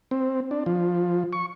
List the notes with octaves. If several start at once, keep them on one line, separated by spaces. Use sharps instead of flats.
C4
D4
F3
C#6